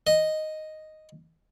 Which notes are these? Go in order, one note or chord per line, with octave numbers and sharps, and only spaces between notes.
D#5